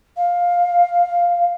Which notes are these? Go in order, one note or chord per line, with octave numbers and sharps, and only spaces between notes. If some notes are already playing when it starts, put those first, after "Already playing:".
F5